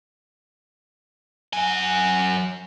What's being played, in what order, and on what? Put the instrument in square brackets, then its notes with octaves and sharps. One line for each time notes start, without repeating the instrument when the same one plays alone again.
[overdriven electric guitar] F#3 G#5